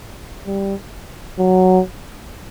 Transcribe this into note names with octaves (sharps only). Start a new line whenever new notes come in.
G3
F#3